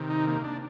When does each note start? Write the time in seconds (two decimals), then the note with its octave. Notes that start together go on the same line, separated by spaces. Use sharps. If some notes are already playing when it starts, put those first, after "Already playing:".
Already playing: C3 D#3
0.10 D#4
0.27 A#3
0.44 D4